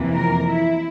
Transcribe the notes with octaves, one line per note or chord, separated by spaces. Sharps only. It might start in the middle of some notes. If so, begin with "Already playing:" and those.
Already playing: F2 C3 E3 A#3
A#4
E4